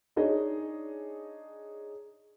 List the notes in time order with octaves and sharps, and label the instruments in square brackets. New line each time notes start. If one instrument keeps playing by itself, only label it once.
[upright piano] D4 D#4 G#4 C#5 D#5